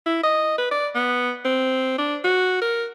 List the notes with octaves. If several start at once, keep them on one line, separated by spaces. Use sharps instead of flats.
E4
D#5
B4
D5
B3
C4
D4
F#4
A#4